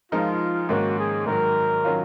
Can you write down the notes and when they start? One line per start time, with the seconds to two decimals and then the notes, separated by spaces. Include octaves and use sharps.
0.12 F3 G#3 D#4 F4 A#4
0.69 G#2 D#3 A#3 C#4 F#4
0.98 G#4
1.26 G#2 D#3 F#3 A#4
1.84 D#3 F#3 C#4 F4